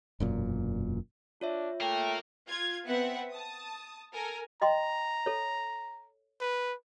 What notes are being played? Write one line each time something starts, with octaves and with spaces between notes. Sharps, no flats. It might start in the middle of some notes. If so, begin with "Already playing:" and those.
E1 F#2 A#2
D4 F4 C#5 E5
A3 A#3 A#4 G5
F4 G#6
B3 C4 B4 E5 F#5
A5 D#6
A4 A#4 G#5
D#5 G5 A#5 C6
A4 C#5
B4